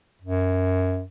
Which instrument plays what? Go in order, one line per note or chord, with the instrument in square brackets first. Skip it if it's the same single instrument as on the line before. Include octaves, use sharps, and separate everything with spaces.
[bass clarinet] F#2